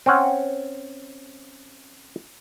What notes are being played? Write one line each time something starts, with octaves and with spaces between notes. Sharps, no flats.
C4 C#4 F#5